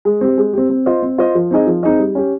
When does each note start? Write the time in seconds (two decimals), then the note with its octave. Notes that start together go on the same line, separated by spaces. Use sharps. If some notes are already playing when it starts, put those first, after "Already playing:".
0.05 G#3
0.21 C4 G4
0.38 G#3
0.53 C4 G4
0.70 C4
0.86 F4 C5 D#5
1.02 C4
1.18 F4 C5 D#5
1.35 F3
1.51 C4 D#4 G#4 D#5
1.67 F3
1.83 C4 D#4 G#4 D#5
1.99 G3
2.15 C#4 G4